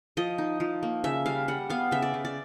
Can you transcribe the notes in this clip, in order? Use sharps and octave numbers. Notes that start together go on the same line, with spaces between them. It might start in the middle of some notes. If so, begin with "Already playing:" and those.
F3 D#5
D#4
F3
A#3
C#3 E5
G3 F5
G3 F#5
B3 F5
C#3 E5
D5
C#3
D5